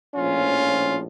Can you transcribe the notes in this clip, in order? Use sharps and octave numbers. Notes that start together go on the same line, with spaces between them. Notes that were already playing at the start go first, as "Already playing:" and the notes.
A#1 A2 F3 C#4 F4